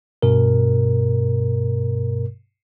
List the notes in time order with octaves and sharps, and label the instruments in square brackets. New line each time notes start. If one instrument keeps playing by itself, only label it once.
[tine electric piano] G2 B2 A#4